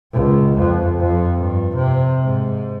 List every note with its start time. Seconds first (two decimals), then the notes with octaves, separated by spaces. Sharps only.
0.13 C#2
0.59 F2
1.00 F2
1.37 G2
1.75 C3
2.22 G#2